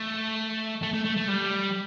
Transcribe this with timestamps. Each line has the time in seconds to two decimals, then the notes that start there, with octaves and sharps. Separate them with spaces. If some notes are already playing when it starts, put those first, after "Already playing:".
Already playing: A3
0.82 A3
0.93 A3
1.04 A3
1.16 A3
1.28 G3